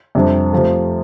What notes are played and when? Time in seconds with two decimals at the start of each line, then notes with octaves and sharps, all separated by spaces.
0.15 F2 C3 G3 D4
0.52 C3 F3 A3